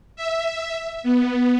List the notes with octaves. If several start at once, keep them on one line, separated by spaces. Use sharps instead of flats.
E5
B3